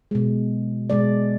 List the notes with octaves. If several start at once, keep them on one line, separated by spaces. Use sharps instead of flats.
B2 G#3
B2 G#3 D5